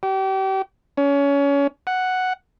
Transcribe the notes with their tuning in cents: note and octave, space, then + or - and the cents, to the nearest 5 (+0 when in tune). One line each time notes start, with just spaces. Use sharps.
G4 -35
C#4 +25
F#5 +0